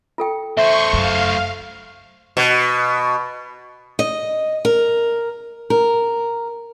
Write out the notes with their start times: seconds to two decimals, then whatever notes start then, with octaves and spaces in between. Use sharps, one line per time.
0.18 F4 A4 G5
0.57 A3 C5 E5 C#6
0.93 F#2 F5
2.37 B2
3.99 D#5
4.65 A#4
5.70 A#4